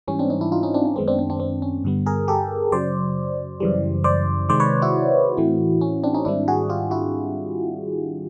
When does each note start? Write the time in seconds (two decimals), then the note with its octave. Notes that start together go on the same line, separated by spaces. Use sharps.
0.08 G#2 E3 G3 C#4
0.19 C4 D4
0.30 C#4 D#4
0.41 D4 E4
0.52 D#4 F4
0.63 C#4 D#4
0.74 C4 D4
0.85 C#4
0.96 F#2 D#3 G#3 B3 C4
1.08 C4 D4
1.19 C4
1.30 C4 D4
1.40 C4
1.62 C#4
1.84 G2 D3 G3 B3
2.06 G#4 A#4
2.28 G4 A4
2.72 F#2 C#3 F#3 C5 D5
3.60 F#2 C#3 E3 G3
4.04 C5 D5
4.49 C3 D#3 G#3 C4 C5 D5
4.60 B4 C#5
4.82 E4 F#4
5.37 A2 E3 A3 C4
5.81 C#4
6.03 C4 D4
6.14 C#4 D#4
6.25 G#2 D#3 G3 C4 D4 E4
6.48 F#4 G#4
6.69 F4 G4
6.91 E4 F#4